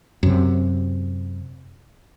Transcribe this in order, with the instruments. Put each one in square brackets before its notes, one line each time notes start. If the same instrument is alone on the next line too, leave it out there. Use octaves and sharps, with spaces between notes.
[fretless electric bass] F#2 C3